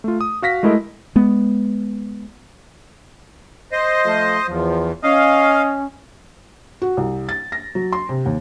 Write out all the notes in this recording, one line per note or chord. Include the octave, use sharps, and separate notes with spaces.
A3 F4
D#6
F#4 F5 A#6 B6
G#3 A3 E4 A#4 D#5
G#3 B3
C5 D#5
F3 A3
E2 F3
C#4 D#5 F5
F#4
C2
A6
A#6
F#3
C6
C3
D#2